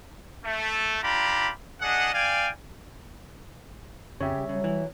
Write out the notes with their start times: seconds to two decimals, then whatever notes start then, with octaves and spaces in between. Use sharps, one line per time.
0.44 A3
1.02 D4 F4 G4 A#5 B5
1.81 D4 G#4 D#5 F#5
2.13 D5 F5 G5 G#5
4.21 F2 C#3 G4 C#5 E5
4.37 G3
4.49 C#3 F#3
4.64 E3